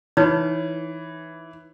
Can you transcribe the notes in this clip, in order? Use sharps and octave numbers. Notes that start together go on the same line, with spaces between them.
E3 D#4 B4 C#5